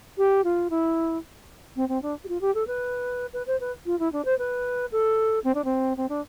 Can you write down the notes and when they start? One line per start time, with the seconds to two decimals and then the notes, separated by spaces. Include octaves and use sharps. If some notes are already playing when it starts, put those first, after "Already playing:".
0.18 G4
0.44 F4
0.70 E4
1.76 C4
1.89 C4
2.02 D4
2.24 G4
2.28 F4
2.41 G4
2.55 A4
2.67 B4
3.33 B4
3.47 C5
3.60 B4
3.86 F4
3.99 E4
4.12 D4
4.25 C5
4.39 B4
4.92 A4
5.44 C4
5.55 D4
5.65 C4
5.97 C4
6.09 D4